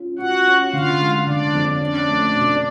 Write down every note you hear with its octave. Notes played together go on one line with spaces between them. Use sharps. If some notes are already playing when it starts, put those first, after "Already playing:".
Already playing: C#4 F4
F4 F#4 F#5
C#4
D3 F4 F5
G#3
D3 D4 D5
F2
C#4 D4 D5
A3
B2